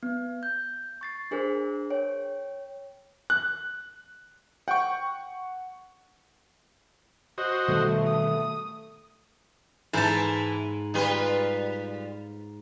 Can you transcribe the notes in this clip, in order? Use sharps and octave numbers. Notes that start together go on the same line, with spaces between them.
B3
G6
C#6 A6 C7
D4 G#4 A#4 C5
C#5 G5
F#6
F#5 G5 C#6
F#4 C5 D#5
B2 D#3 G3 A3
D#6
G#2 E3 E4 A5
G3 F4 B4